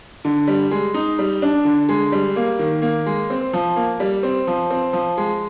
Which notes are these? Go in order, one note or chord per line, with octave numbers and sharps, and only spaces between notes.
D3
G3
G#3
D#4
G3
D4
D3
G#3
G3
A#3
D#3
A#3
G#3
C4
F3
A#3
G3
C4
F3
C4
F3
G#3